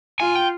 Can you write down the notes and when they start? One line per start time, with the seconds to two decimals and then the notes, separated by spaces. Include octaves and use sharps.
0.20 F4 G#5
0.35 G5